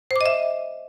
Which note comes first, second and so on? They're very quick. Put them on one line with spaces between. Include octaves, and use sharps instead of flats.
C5 D6 D#5 E5